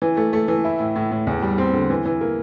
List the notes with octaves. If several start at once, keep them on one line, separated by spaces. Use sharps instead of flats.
E3
A3
A3
E3
E4
A2
A2
A2
E2
G3
C4
D3
E3
E3
A#3